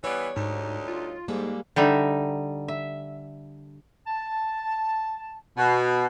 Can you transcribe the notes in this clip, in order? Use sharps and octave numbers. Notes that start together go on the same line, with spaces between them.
E3 G3 B3 C#5
D2 G#2 G3 D#4
F4
G#2 G3 G#3 A#3 A4
D3 G3 D#4 E5
E5
A5
B2